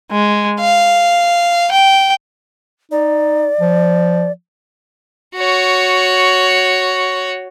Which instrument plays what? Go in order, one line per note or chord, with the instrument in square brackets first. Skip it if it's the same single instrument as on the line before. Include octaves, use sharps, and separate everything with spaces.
[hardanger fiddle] G#3
F5
G5
[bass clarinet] D#4 [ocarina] D5
[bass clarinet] F3
[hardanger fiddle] F#4 C#5